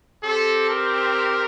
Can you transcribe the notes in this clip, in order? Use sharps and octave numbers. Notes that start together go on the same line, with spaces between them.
C4 G4 A4
A#4